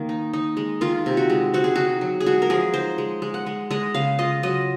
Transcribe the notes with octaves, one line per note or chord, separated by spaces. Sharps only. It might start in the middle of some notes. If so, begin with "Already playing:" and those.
Already playing: D#3 A#3
D#4
D#4
G#3
D#3 F4
C3
F#4
G#3
C4 F#4
G#4
D#4 F#4
F#3
G#4
G#3 F#4
A#4
F3 G#4
D#4 C5
G#3
G#3
F#5
G#3
G#3 D#5
C#3 F5
F4 D#5
F#3 D#5